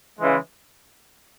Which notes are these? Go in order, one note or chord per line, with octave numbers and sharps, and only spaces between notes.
C#3 E3 G#3